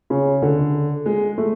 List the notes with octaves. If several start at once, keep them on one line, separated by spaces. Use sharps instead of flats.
C#3
D3
G#3
A3